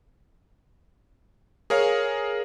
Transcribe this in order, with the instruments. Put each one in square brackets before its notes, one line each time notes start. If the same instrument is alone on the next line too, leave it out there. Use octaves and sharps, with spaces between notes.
[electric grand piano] G#4 A#4 C#5 F5